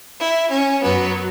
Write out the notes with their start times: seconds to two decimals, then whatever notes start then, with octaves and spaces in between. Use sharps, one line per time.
0.20 E4
0.51 C#4
0.83 F#2 F#3 B3